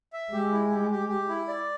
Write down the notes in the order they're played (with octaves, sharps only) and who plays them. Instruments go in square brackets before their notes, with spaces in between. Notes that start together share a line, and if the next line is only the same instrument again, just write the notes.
[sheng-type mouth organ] E5
[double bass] G#3 [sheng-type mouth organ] G4
[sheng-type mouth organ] E4
G4
G4
G4
E4
D5